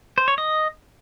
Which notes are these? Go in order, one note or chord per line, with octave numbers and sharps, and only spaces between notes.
C5
C#5
D#5